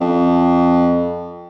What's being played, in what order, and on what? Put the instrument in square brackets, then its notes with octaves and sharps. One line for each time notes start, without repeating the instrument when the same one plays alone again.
[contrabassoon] F2